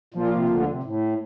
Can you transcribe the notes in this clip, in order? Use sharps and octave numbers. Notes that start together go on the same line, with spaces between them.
A#2 F3 A#3 F4
C3
D2 D3
C3
A2